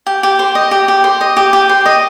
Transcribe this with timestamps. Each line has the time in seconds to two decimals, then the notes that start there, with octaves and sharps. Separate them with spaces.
0.07 G4
0.23 G4
0.39 C5
0.55 D#5
0.71 G4
0.88 G4
1.04 C5
1.21 D#5
1.37 G4
1.53 G4
1.69 C5
1.86 D#5